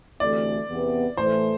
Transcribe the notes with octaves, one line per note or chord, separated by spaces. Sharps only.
D2 C3 E3 A3 D5
E2 C3 E3 B3
A2 E3 A3 C5